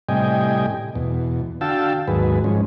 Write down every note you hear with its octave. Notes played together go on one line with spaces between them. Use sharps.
A2 C3 G3 D#5 G5 G#5
E2 B2
D3 F#4 F5 G5 A5 E6
D#2 G#2 F#3 G#4 B4
G#2 F3 G#3 C#4